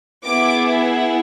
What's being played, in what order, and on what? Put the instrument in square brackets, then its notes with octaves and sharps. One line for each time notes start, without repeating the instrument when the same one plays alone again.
[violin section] B3 E4 G#4 D6